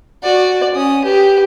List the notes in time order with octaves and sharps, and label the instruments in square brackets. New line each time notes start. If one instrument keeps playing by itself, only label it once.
[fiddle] F#4 D5
C#4 D#6
G4 B4